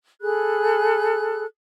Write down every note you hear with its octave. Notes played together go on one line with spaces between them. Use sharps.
G#4 A4 B5 F#6